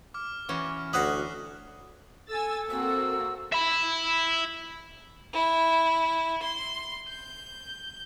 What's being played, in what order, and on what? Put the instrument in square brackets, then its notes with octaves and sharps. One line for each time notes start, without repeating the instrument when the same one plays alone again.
[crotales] D6 F6
[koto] E3 C#4 F#4
[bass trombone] D2 [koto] C#4 [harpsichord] F#4 B4 D#5 [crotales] F#6 C7 F#7
[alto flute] A4 [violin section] G#5 E6 A6
[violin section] A#3 C4 F#4 [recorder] E6
[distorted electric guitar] E5 B5
[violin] E4
C6
G6